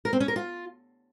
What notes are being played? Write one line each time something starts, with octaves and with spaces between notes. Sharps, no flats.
A#4
C4
C#4
A#4
F4